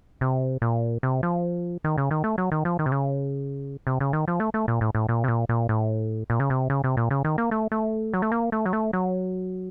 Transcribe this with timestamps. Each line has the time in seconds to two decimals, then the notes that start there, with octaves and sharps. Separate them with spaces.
0.21 C3
0.62 A#2
1.03 C3
1.23 F3
1.84 D#3
1.98 C#3
2.11 D#3
2.24 A3
2.38 F#3
2.52 D#3
2.65 F3
2.79 D#3
2.86 C3
2.92 C#3
3.87 C3
4.00 C#3
4.13 D#3
4.28 F3
4.40 A3
4.54 A3
4.68 A#2
4.81 A2
4.95 A2
5.09 A#2
5.24 C3
5.28 A#2
5.49 A#2
5.69 A2
6.30 A#2
6.40 C#3
6.50 C3
6.70 C#3
6.84 C3
6.97 A#2
7.11 C#3
7.24 D#3
7.38 A#3
7.51 A3
7.72 A3
8.14 F#3
8.22 A3
8.32 A#3
8.52 A3
8.66 F#3
8.73 A3
8.93 F#3